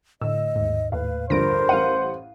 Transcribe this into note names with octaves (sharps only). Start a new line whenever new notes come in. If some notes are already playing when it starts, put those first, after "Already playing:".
A2 D3 D#5 E6
D#2 G#2
D#2 A2 B4 F5
D2 G2 F3 A#4 C5 A#6 D7
A1 G3 F5 F#5 D#7